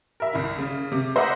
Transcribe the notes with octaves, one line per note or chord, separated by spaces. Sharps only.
A#4 E5
C2 E4
C#3
C3
C5 D#5 E5 F#5 A#5 D6